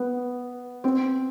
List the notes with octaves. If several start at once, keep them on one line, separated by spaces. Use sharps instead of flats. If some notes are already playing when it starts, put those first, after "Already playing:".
Already playing: B3 B4
C4 C5